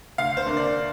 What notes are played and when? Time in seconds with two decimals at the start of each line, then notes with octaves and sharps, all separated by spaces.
0.18 D2 F5
0.37 C5
0.47 D3 A#3 D4
0.57 D5